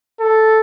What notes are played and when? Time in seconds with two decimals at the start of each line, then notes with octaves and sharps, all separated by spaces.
0.20 A4